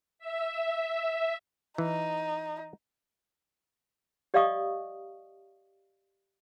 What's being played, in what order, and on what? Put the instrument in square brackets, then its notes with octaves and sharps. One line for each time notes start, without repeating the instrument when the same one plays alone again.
[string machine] E5
[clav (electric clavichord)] E3 [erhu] D#4
[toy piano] G4 D5 D#5 F5 C#6 D#6